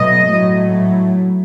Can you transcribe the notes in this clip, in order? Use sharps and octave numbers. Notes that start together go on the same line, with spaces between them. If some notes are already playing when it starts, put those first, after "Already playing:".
Already playing: B2 F#3 A3 D#5
A2 F#3 A3